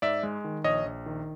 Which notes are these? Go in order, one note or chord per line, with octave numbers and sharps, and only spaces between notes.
G#2 D5 E5
G#3
D#3
A#1 C#5 D#5
A#1
D#3